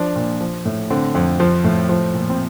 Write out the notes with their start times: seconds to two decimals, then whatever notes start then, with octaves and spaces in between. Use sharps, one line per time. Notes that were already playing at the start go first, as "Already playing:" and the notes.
Already playing: F3 D4
0.16 A#2
0.41 F3
0.66 A2
0.90 D3 C4
1.15 F2
1.40 F3
1.64 A2
1.89 F3
2.15 A#2
2.30 C4